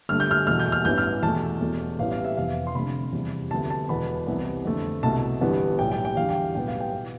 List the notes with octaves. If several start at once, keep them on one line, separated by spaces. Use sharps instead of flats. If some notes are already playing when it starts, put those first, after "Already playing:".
G1 G2 D3 A3 F6
G6
F6
E2 B2 A3 F6
G6
F6
A1 G2 E3 B3 G6
F6
E2 B2 A3 A5
E1 E2 B2 A3
A1 A2 G3 B3 F5
F5
E5
F1 F2 E3 B3 F5
C6
F1 F2 D3 A3 B5
F1 E2 C3 G3
D2 C3 F3 B3 A5
A5
E1 E2 B2 B3 B5
C2 C3 E3 G3 B3
F2 D3 A3
C2 B2 A3 A5
G1 G2 E3 G3 B3
B1 A2 G3 G5
G5
G5
E2 D3 G3 F5
G5
B1 A2 G3 B3 G5
F5
G5
B2 B3